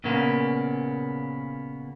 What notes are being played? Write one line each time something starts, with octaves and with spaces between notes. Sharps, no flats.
A#2 C#3 A#3 B3